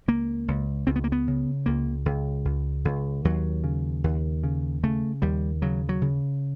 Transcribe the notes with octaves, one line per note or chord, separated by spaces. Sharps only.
C#2 A#3
C#2
C#2 C4
B3
A#3
B3
C#3
C#2 A#3
C#2
C#2
C#2
D#2 F#3
C#3
D#2
C#3
C#3 A3
D#2 G3
C#3 F#3
F#3
C#3